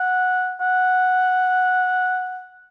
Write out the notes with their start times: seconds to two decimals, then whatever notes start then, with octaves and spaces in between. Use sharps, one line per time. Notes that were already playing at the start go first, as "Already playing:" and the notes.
Already playing: F#5
0.61 F#5